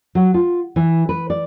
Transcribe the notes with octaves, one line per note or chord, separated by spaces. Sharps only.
F#3
F4
E3
B4
D5